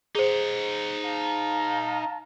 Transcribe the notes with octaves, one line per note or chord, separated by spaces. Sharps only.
D#4 G#4 C5 F#5
F5 A5 A#5